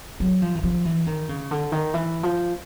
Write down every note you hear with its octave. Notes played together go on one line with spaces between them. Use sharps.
F#3
F3
E3
F3
E3
D#3
C#3
D3
D#3
E3
F3